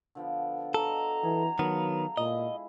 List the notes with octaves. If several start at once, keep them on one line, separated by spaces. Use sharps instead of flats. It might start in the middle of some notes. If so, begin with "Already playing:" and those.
D3 F3 B3
D#4 F#4 A4 D5 A#5
E3 G#4
D#3 F#3 B3 G#4 A4 F5
A#2 G#3 E4 F4 D#5